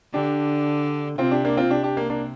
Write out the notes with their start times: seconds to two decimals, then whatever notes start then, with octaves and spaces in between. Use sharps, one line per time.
0.14 D3 D4 G4
1.18 C3 C4 F4
1.31 D4 G4
1.45 A#3 D4
1.57 C4 F4
1.70 C3 D4 G4
1.83 D4 G4
1.97 A#3 D4
2.10 A#3 D4